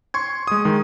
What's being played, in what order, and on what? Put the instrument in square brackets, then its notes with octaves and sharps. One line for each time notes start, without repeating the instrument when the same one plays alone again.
[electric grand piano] C6 C#6 G#6
G#3 D#6
D#3 G#3